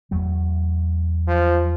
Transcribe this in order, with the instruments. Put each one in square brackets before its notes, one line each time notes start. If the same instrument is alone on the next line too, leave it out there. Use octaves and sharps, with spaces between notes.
[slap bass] E2 F#3 A3
[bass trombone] F3